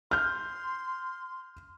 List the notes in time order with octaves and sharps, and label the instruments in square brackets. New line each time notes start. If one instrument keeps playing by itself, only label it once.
[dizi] C6 [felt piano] F6 G6